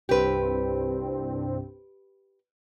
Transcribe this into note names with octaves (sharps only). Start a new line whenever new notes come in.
C2 G2 C4 G4 B4